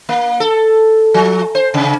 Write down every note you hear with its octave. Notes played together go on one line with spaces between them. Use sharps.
A#3
A4
F3
C5
C3